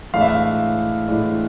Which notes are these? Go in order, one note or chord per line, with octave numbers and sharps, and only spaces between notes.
A2 E3 G#3 D4 F5
E5
F5
A2 E3 G#3 D4